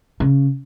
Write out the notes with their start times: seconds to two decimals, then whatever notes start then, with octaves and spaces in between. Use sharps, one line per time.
0.20 C#3